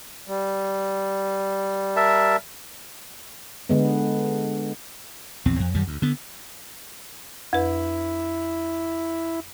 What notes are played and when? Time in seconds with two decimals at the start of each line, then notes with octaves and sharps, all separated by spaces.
0.28 G3
1.96 A#4 E5 A5
3.69 D3 G#3 B3
5.45 A#1 E2 C4
5.60 F2
5.75 F#2 D#3 G3
5.87 D2
6.02 D3 B3
7.53 F2 E4 B4